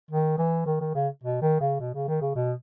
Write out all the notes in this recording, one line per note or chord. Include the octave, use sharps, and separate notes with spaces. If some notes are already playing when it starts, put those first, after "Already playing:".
D#3
E3
D#3
D#3
C#3
B2
D#3
C#3
B2
C#3
D#3
C#3
B2